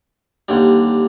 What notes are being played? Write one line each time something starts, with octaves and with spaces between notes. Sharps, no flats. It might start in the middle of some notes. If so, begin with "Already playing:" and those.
D#2 D3 G3